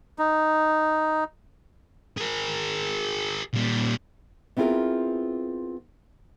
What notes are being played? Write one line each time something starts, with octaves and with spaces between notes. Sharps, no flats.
D#4
G#4 A#4
A#2 G3
B3 C4 E4 F4 G#4 A#4